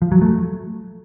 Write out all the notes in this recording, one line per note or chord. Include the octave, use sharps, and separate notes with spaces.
F3
F#3
A3